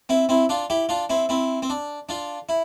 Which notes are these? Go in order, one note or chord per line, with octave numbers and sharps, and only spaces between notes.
C4 E4
C4 E4
D4 F4
E4 G4
D4 F4
C4 E4
C4 E4
C4
D4
D4 F4
E4